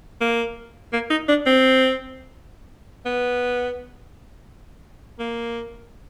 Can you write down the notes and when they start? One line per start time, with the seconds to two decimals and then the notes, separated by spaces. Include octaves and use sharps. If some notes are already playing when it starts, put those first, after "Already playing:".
0.21 A#3
0.93 A#3
1.10 D#4
1.28 D4
1.46 C4
3.06 B3
5.19 A#3